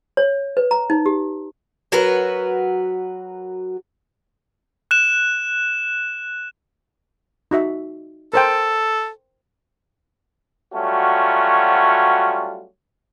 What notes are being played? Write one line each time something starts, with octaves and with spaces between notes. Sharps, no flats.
C#5
B4
A#5
D#4
G4
F#3 F#4 A#4 B4
F#6 E7
D#4 F#4 E5
A4 A#4 C5 G5
F#3 G3 A3 C#4 F4 F#4